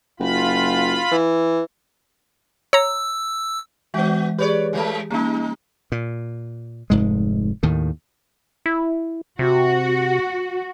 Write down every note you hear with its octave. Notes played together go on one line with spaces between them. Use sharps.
F#1 F4 B5
E3
C#5 A#5 E6
E3 G#3 B3 F#4
G4 G#4 B4 C#5 D5
E3 F3 G#3
G3 A#3 C#4 D#4
A#2
F1 G#2 G#3
D#2 A2 D#3
E4
C3 F#4